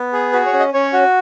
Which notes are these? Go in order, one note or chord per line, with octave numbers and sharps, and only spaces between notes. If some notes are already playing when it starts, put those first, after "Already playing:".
Already playing: B3
G#4
F#4 B4
C#5
C#4
D#5
C#4 C#5
F#4